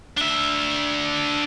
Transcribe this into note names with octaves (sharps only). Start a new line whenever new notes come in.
D4 E5